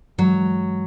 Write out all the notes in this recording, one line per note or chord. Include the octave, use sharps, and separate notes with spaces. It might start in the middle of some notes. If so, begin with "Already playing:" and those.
G2 E3 F#3 G#3